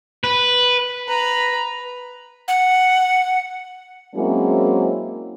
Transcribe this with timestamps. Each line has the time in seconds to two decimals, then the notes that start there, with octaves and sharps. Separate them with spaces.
0.24 B4
1.08 B4 A#5
2.48 F#5
4.15 F#3 G#3 A#3 C4 C#4 E4